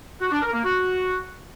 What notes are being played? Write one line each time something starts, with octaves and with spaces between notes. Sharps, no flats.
F#4
D4
A#4
A#3
F#4